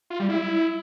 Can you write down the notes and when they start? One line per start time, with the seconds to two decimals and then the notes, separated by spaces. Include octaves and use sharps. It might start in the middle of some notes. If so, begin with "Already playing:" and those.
0.10 F4
0.20 G3
0.29 E4